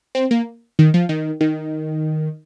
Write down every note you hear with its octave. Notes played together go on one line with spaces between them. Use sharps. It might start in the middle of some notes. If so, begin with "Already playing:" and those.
C4
A#3
D#3
F3
D#3
D#3